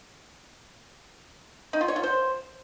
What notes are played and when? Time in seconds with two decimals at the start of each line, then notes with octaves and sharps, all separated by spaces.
1.73 D#4
1.81 F4
1.88 C#5
1.96 F4
2.03 C5